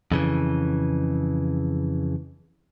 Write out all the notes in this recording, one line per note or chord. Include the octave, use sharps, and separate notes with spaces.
F2 C#3 E3